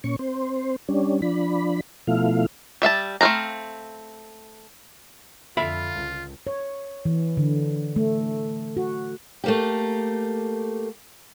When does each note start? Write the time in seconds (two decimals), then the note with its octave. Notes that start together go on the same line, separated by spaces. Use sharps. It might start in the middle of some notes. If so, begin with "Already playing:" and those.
0.04 A#2 C#4 C#6
0.19 C4 C5
0.89 G3 C#4 D4
1.22 F3 D4 B5
2.07 B2 F3 A3 E4 F5
2.82 G3 E5 F5 A5
3.21 A3 C4 B4 F5 A#5
5.57 F2 D3 F4 E5 F5 B5
5.95 C#2
6.47 C#5
7.05 E3
7.37 D3
7.96 A3
8.77 F#4
9.44 A3 A#3 G4